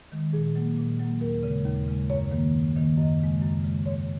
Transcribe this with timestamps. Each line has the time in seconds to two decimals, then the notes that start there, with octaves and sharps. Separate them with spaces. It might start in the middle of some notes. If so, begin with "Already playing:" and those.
0.12 D#3 G#3
0.33 A#2 G#4
0.55 F#3 A#3
0.78 A#2
1.00 F#3 A#3
1.21 D#2 A#4
1.43 C#3 G#3
1.65 D#2
1.88 C#3 G#3
2.10 F#2 C#5
2.31 D#3 A#3
2.54 F#2
2.76 D#3 A#3
2.97 F#2 D#5
3.20 C#3 G#3
3.41 F#2
3.64 C#3 G#3
3.86 G#2 C#5